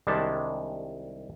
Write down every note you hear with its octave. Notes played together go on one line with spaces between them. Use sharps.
C2 D#3 G3 G#3 D4 A5